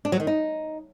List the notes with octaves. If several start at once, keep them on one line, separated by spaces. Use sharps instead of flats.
D4
F#3
D#3
D#4